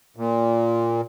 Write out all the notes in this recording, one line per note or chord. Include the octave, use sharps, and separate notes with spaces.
A#2